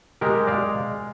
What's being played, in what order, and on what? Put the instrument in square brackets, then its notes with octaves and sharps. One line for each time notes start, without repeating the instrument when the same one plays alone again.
[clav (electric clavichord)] G#3 G4 A#4
G#3 D5 F5